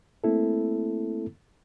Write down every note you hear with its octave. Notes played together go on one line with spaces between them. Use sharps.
A3 A#3 C4 E4 A4